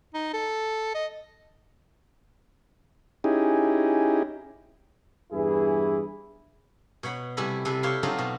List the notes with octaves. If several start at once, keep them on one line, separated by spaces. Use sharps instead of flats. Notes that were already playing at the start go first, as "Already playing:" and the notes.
D#4
A4
D#5
C#4 D#4 E4 G4 G#4
E2 G2 E3 E4 G#4
B2 C#5 F#5 B5
C3 G3 A3 E4 G#5 B5
C3 G3 A4 B4
E4 G4 C#5 E5 F5 C6
F#3 A3 C4 D4 D#4 F4
B2